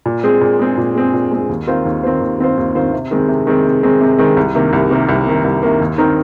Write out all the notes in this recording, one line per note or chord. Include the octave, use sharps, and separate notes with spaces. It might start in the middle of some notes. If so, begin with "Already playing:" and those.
A#2
G#3 C4 G#4
A#2
G#3 C4 G#4
A#2
G#3 C4 G#4
A#2
G#3 C4 G#4
D#2
D#3 C4 F4 C5
D#2
D#3 C4 F4 C5
D#2
D#3 C4 F4 C5
D#2
D#3 C4 F4 C5
C3
D#3 G#3 C4
C3
D#3 G#3 C4
C3
D#3 G#3 C4
C3
D#3 G#3 C4
C2
C3 D#3 A#3
C2
C3 D#3 A#3
C2
C3 D#3 A#3
C2
C3 D#3 A#3
D#2
D#3 C4 D#4 A#4